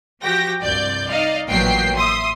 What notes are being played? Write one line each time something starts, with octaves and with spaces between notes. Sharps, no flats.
F3 F#4 G4 G5 A#6
C2 G2 D5 G6
D#4 D5 D#5 F5
A1 A#2 F#3 B3 G5 C7
E5 C6 D#6